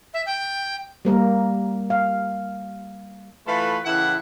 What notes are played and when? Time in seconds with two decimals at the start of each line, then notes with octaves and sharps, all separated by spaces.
0.14 E5
0.26 G5
1.05 G3 A#3 A#4
1.90 F5
3.47 E3 A3 F4 A4 B4 B5
3.84 A2 C#3 E3 E4 F#5